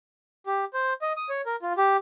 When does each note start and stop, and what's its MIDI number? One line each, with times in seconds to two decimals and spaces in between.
0.46 0.65 67
0.74 0.94 72
1.02 1.13 75
1.17 1.29 87
1.29 1.41 73
1.46 1.56 70
1.62 1.73 65
1.77 1.97 67